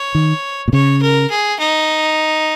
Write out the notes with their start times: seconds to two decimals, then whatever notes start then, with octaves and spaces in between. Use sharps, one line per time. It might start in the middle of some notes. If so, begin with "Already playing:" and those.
Already playing: C#5
0.15 D#3
0.68 A#2
0.73 C#3 C#5
1.02 A#4
1.30 G#4
1.60 D#4